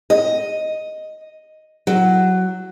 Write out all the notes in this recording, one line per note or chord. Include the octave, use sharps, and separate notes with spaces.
D#5
F#3